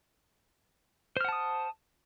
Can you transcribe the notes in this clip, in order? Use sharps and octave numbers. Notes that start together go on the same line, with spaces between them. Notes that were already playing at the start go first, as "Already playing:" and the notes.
C5 F#5 A5 D#6 F6